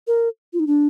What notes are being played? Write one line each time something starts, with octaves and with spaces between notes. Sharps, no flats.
A#4
F4
D#4
D4